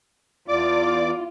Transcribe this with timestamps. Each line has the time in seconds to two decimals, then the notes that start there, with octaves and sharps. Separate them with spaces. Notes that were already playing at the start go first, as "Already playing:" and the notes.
0.49 E2 F4 D5 D6